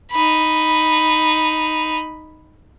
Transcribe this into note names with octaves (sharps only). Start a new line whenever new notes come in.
D#4 B5